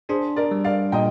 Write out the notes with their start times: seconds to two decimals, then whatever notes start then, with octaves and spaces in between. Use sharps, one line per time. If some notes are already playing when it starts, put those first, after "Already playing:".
0.09 D4 G#4 C5
0.36 A#4 D5
0.51 G3
0.64 D5 F5
0.92 A#2 D#5 G5